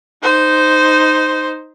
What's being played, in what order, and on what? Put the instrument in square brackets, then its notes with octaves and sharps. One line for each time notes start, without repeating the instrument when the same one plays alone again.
[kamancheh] D#4 C5